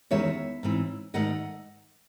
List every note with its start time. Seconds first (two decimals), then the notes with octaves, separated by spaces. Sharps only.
0.11 E2 D#3 G#3 C#4 C#5 E5
0.63 G#2 E3 C4
1.14 G#2 D#3 A3 D#5 F#5